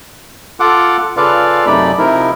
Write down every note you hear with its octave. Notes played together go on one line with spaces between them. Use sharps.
F4 A4 F#5 D6
C#3 F4 A4 B4 D5 F5
F#2 C3 A3 D#4 D5 B5
C3 F3 D#4 E4 A#4